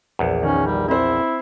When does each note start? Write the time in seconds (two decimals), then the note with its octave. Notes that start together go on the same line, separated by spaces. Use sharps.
0.19 A#1 E2
0.43 D#3 C#4
0.66 G3
0.88 C4 E4 C5